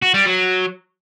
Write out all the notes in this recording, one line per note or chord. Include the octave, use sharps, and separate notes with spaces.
F#4
G3
F#3